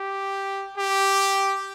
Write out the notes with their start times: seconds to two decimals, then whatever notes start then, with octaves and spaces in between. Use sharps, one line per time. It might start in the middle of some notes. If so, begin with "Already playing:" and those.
Already playing: G4
0.77 G4